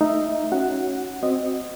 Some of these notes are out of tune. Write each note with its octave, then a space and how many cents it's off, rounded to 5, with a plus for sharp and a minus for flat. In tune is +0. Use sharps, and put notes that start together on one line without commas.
A3 +0 D#4 +0 E5 +10
C#4 +0 F#4 +0 F#5 +0
C4 +0 F#4 +0 D#5 -10